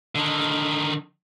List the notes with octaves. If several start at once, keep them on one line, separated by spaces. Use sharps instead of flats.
D3 D#3